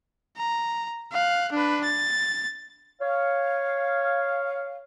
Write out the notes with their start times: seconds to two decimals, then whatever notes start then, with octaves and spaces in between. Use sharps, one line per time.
0.37 A#5
1.12 F5 F#6
1.52 D4 B4
1.84 A6
3.01 C#5 F5